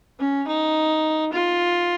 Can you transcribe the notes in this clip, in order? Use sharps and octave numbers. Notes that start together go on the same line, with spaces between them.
C#4
D#4
F4